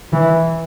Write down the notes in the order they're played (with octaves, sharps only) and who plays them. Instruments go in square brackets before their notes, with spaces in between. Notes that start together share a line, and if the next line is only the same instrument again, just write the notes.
[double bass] E3